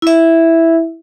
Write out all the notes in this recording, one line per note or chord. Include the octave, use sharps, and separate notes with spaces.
E4 E5